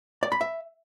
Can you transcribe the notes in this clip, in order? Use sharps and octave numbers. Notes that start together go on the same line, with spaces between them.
D5
B5
E5